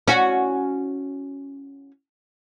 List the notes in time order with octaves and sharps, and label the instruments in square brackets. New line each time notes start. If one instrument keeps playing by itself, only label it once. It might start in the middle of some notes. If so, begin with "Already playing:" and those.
[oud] C#4 F#4